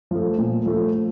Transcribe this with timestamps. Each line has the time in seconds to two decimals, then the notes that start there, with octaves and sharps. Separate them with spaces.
0.11 F3 A3
0.38 A#2
0.66 F3 A3